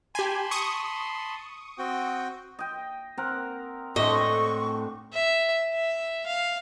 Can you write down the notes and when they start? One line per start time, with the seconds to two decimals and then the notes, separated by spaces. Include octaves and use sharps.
0.15 G4 G#5 A5 B5 C6
0.51 C#6 D#6
1.78 C4 F#4 G5
2.59 D#5 G5
3.17 C4 A#4 F#5
3.96 A2 G#3 C4 D4 D#5 E5 C#6
5.13 E5
5.74 E5
6.26 F5